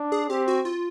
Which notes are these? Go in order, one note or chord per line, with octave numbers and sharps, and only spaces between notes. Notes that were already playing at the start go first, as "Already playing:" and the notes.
Already playing: D4
G#4
C4 G4
F#4
F4